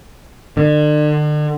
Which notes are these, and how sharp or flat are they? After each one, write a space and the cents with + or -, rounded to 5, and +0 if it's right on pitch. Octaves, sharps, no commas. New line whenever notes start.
D3 +40